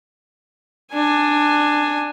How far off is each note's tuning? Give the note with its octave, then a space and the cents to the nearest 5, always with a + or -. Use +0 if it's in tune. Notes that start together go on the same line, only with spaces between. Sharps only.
D4 +15 G#5 +0